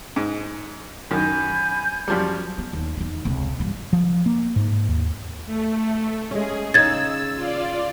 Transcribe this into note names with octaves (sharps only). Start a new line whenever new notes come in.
G#2
F#2 D#3 G#5 B5 G6
F#2 F3 G3
B3
D#2
E2 D#3
C#2 C3
G2 E3
F3
A#3
G#2
D#2
A3
G#3 C#4 G#4
C#3 D#4 E6 G#6 A6
F4 D5